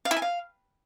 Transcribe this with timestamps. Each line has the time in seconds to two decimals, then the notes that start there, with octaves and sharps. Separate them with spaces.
0.05 F5
0.11 E4
0.16 G#5
0.22 F5